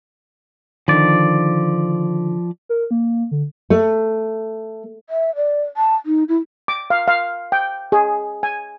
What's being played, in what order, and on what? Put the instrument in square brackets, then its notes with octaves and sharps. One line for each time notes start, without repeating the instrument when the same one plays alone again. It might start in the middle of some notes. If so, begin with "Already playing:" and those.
[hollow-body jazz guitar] D3 D#3 [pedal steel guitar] F3 D5
[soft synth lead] A#4
A#3
D3
[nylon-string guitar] A3
[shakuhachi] E5
D5
A5
D#4
E4
[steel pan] D6
F5
F5
G5
G#4
G#5